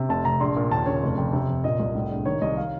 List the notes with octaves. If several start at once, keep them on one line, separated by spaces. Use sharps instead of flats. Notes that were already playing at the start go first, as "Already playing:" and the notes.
Already playing: C3
F1 A5
F1 A#5
A#1 C6
A#2
D#2 A5
C#3 C#5
F1
F2
C3
F2
A#2 D#5
C2
A2
A#1
D#3 C#5
C2 D#5
F5